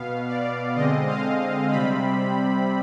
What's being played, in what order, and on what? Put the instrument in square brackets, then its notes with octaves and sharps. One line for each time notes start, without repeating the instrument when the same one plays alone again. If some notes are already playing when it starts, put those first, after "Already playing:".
Already playing: [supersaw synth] B2 B3 F5
D5
D3 G#3 C4 D#5
F5
C3 G3 C4 B5